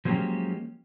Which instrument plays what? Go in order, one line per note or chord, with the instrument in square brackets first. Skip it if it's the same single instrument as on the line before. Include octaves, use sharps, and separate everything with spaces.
[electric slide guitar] F3 F#3 G#3 A#3 C#4 G4